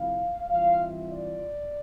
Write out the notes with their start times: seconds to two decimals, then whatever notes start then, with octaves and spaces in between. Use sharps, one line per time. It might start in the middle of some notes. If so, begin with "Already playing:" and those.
Already playing: C3 F3 A3 E4 F5
0.49 E3 G3 C4 F4 F5
0.81 E5
1.11 D5